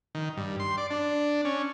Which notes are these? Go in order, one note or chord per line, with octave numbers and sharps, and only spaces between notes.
D#3
G2
C6
D5
D4
C#4